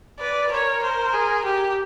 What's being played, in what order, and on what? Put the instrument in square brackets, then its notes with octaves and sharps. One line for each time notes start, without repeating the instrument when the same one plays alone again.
[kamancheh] B4 [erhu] D5
[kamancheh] A#4 [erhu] C#5
[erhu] C5
G#4
G4